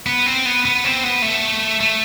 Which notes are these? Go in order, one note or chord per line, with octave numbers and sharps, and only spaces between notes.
B3
C4
B3
B3
C4
B3
A3
A3